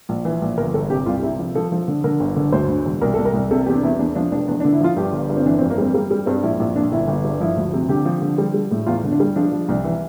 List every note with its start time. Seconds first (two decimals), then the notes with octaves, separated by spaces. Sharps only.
0.09 A#1
0.25 E3
0.42 A#1
0.58 G1 A#4
0.74 G1 A4
0.90 C3 G4
1.06 C2 F4
1.22 C3 E4
1.39 F3
1.55 F3 A4
1.72 F3
1.88 D3
2.04 D3 A#4
2.20 G1
2.36 D3
2.52 D2 C5
2.69 D3
2.85 E1
3.01 C2 A#4
3.14 C2 A4
3.25 A#4
3.34 C2
3.51 C3 A4
3.66 E2 G4
3.75 D4
3.83 E2 E4
3.99 E2 D4
4.15 F3 D4
4.31 F1 D4
4.48 E2 D4
4.60 D4
4.65 D3
4.72 E4
4.81 F3 F4
4.97 G2 G4
5.13 G1
5.30 G2
5.37 C4
5.46 E3 D4
5.58 C4
5.62 F2
5.70 A#3
5.78 G3 C4
5.94 G3 A#3
6.11 G3
6.26 G2 C4
6.43 A#1 E4
6.59 A#1 E4
6.75 A#2 D4
6.92 G1 E4
7.08 G1
7.25 G2
7.41 F3 E4
7.57 D2
7.73 C3
7.89 D3 G4
8.05 F3
8.22 D3
8.38 G3
8.54 G3
8.71 A2
8.87 E2 F4
9.04 D3
9.12 D4
9.20 G3
9.36 F3 D4
9.52 F3
9.69 C2
9.84 E3